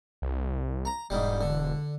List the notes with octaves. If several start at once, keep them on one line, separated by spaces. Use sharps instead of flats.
C2
A#5
E1 G#2 G3
D3